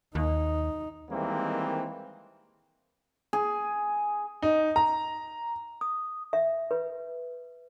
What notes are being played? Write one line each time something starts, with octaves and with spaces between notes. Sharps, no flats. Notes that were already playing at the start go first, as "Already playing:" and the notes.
D#2 D#4
D#3 E3 G3 G#3 A#3 C4
G#4
D#4
A#5
D#6
E5
B4